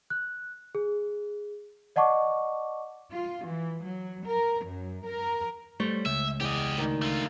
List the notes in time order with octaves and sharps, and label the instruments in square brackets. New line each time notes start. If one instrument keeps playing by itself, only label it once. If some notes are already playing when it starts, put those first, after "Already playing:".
[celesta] F#6
G#4
D5 D#5 F#5 A5 C#6 D6
[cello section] F4
E3
F#3
A#4
F#2
A#4
[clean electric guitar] G3 A3 C5 [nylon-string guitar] C#5
[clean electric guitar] C#2 [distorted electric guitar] E5
[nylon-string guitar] E2 [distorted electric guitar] G4 D#5
[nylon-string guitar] D2 D#3
[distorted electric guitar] A3 F4